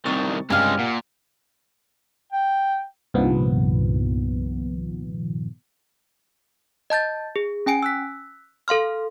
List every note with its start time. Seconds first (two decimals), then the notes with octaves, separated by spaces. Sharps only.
0.05 C2 C3 D#3 C#6 A6
0.50 C#2 G2 C3 G#3 G4 F5 G#5
0.79 A#2 F#5
2.32 G5
3.14 C2 G2 A#2 D#3 F3 B3
6.90 D#5 A5 G6 A6
7.36 G#4
7.66 C#4 G5 G#5 D7
7.83 E6 F#6 B6
8.68 A4 F5 C6 F6